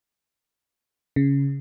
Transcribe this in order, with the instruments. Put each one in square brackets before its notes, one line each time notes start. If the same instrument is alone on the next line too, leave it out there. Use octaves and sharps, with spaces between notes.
[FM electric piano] C#3